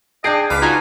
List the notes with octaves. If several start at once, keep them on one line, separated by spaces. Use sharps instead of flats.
D4 G#4 D#5 G5 A5 C7 D7
C#2 B4 F5 D6 B6
D#4 F4 F#4 G#5 A#5